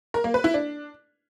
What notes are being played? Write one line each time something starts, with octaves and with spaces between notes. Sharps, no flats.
A#4
A#3
B4
E4
D4